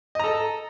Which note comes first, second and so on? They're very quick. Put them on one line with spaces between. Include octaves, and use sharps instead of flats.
D#5 A#5 A4